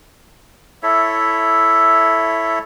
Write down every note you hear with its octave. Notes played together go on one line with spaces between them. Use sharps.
E4 A4 C#5 E5